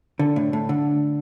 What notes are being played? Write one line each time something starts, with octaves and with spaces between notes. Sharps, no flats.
D3
A2
A2
D3